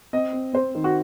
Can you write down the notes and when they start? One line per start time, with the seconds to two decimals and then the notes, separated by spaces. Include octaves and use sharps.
0.13 C4 D#5
0.33 C4
0.53 C4 C5
0.75 D#3
0.84 F#4